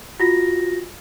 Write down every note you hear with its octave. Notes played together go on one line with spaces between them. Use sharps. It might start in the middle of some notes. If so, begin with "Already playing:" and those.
F4 F#4 A#6